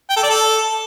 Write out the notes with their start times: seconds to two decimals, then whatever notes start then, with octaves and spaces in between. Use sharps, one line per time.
0.10 G5
0.16 A4
0.23 D5
0.29 A4